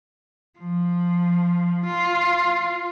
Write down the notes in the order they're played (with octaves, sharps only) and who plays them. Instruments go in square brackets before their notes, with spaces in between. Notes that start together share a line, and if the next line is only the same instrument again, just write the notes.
[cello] F3
F4